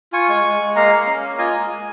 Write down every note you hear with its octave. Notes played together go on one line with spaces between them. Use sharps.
F4 G#5 C#6
G#3
G#3
G#3
A#3 F5 A#5
A#3
C#4
A#3
F4 D#5 G#5
G#3
G#3